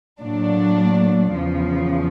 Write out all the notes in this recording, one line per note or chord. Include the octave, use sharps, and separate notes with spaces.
A2 F#3 A#3 D4
E2 C#3 F3